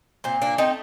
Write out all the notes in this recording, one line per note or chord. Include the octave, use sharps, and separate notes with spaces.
A#2 C4
A#3 D4
A3 C4 D#4